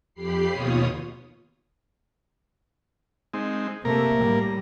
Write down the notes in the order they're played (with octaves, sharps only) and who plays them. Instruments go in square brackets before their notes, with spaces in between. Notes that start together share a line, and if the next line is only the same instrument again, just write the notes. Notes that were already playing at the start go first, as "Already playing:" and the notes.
[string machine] F2 G4 B5 C7
D#2 B2 F4 C#5 D#6
[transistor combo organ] G#3 C4 D#4
[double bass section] C3 A3 [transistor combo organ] A#3 A#4
[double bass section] A2 G3